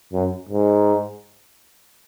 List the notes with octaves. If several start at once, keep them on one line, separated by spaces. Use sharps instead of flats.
F#2
G#2